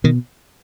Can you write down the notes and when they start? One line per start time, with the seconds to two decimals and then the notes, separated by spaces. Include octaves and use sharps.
0.04 B2 D#3